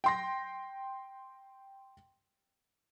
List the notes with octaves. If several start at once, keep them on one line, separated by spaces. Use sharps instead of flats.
G5 C6 A#6